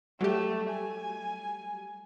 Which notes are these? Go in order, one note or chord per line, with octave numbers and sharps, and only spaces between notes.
F#3 G3 A3 G4
G#5